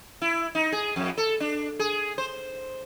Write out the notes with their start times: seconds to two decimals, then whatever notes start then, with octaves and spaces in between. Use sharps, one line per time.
0.22 E4
0.55 D#4
0.72 G#4
0.96 F2
1.18 A4
1.40 D4
1.79 G#4
2.18 C5